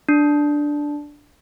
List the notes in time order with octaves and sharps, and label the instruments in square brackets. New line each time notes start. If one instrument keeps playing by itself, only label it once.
[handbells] D4